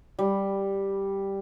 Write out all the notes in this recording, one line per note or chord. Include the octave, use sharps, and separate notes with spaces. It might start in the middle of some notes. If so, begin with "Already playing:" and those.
G3